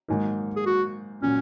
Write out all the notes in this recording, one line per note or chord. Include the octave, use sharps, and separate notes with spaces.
G#2 D#3 F#3 A#3 D#4
G#4
F#4
A#2 F#3 C#4